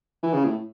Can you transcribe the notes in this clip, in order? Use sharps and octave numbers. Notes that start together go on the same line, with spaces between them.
E3
C#3
A2